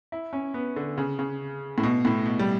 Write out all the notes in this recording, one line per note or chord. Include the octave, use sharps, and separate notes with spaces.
E4
C#4
B3
D3
C#3
C#3
A2
B2
A2
B2
G3